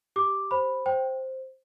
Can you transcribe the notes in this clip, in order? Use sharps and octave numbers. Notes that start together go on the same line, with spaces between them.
G4 D6
C5 B5
C5 G5